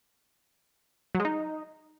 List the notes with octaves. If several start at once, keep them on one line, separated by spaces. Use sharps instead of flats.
F#3
G#3
D#4